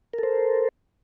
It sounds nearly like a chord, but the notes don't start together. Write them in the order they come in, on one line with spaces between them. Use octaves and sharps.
A#4 A4 C5